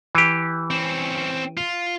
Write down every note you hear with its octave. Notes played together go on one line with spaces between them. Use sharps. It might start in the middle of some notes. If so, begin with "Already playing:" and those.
E3 G4
C4 C#4
F4